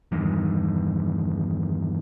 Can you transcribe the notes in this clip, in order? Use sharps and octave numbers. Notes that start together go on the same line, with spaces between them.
E2 G2 D#3